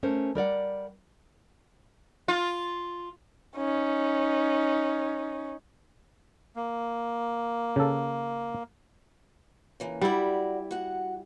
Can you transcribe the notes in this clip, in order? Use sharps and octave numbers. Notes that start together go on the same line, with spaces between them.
A3 C#4 A#4 C5
G3 A#4 D5 F#5
F4
C#4 D#4
A#3
C#3 A4
C#3 E3 A#3
G3 E4 F#4 D5
F#4 F#5